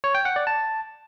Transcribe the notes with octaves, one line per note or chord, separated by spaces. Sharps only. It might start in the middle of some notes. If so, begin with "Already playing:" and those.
C#5
G5
F#5
D5
A5